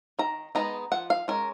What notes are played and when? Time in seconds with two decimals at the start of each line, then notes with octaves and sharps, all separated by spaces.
0.19 D#3 A#5
0.55 G#3 B3 D#4 A#5
0.92 F3 F#5
1.10 F5
1.28 G#3 C#4 A#4